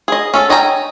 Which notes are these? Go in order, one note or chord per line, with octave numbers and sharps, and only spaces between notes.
G#4 D#5
C#4 A4
C#5 D#5 G5 G#5 A#5